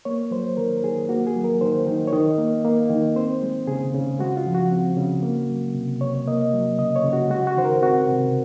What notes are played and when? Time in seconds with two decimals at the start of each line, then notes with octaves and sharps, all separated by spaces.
0.05 A#3 C#5
0.31 F#3 C5
0.57 D#3 A#4
0.83 D#3 G#4
1.09 A#3 F#4
1.27 G#4
1.36 F#3
1.44 A#4
1.61 D#3 C5
1.86 D#3
2.07 C#5
2.13 D#3 D#5
2.38 A#3
2.65 A#3
2.90 D#3
3.16 C4 C5
3.42 G#3
3.67 C#3 G#4
3.94 C#3
4.19 G#3 F#4
4.37 F4
4.46 F3
4.55 F#4
4.71 C4
4.97 C#3
5.23 A#3
5.50 F#3
5.75 C3
6.01 C3 C#5
6.27 A#3 D#5
6.53 F#3
6.78 C#3 D#5
6.96 C#5
7.04 C#3
7.13 F#4
7.30 G#3 F#4
7.47 F#4
7.57 D#3 C5
7.65 A#4
7.82 C4 F#4
8.09 C3